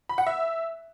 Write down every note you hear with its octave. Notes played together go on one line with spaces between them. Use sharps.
B5
F#5
E5